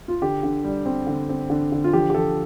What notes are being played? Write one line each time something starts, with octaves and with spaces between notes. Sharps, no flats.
F4
D3 G4
D3
G3
C4
D3
C4
D3
D3
F4
F3 G4
G4
F3 A4